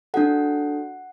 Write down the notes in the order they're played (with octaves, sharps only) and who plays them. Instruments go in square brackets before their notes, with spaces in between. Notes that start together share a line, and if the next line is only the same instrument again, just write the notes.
[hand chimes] D4 F#4 A4 F#5